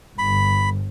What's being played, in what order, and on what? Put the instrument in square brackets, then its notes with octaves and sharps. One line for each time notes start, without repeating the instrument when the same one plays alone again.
[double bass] G1 [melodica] B5